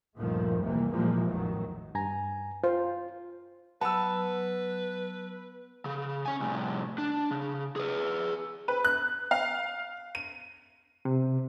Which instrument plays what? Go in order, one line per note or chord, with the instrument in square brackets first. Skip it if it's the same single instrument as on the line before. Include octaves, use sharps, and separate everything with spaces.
[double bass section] G1 D2 A#2 D#3 F3 A3
F1 C3 E3 G3 A#3
A#2 E3 F3 G3 G#3 A#3
A1 F2 D#3 F#3
[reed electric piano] G2 G#5 A#5
[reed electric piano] F4 [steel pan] C5
[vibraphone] F#3 [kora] B3 [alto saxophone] B4 [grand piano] A5 E6
[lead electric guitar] C#3
C#4 G#5
C2 A2
D4
C#3
G#4 B4
[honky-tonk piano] B4
F#6
F5
D#7
[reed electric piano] C3